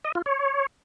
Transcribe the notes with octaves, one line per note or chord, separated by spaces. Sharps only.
D#5
F4
C#5